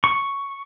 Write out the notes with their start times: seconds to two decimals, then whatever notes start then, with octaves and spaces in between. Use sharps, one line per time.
0.04 C#6